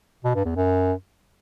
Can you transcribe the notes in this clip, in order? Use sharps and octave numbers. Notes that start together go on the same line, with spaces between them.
B2
G2
E2
F#2